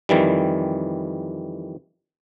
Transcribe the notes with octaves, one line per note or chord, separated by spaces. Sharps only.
F2 D#3 E3 G3